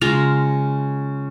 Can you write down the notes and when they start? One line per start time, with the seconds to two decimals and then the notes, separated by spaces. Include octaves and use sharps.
0.01 C#3 G#3 F4 A#5